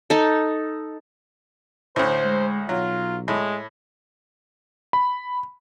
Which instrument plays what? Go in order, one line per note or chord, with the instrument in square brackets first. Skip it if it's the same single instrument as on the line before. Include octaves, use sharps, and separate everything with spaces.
[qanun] D#4 A4
[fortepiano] D2 A2 [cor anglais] C5
[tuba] G#3
[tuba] B1 [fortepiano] F#3 [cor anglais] F4
[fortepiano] A2 [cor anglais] G#3
[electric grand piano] B5